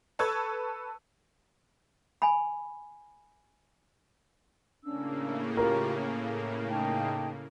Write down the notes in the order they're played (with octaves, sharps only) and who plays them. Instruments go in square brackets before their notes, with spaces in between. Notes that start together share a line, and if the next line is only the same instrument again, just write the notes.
[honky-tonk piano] A4 B4 A5 C#6 E6 G#6
[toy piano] G#5 B5
[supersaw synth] A2 C#3 A#3 [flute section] C#4 D4 E6
[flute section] F4 G4 C#6 [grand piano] A#4
[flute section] C#4
D#4 G5 A5